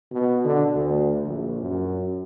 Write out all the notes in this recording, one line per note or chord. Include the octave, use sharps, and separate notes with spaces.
B2
D3
D2
A#1
F#2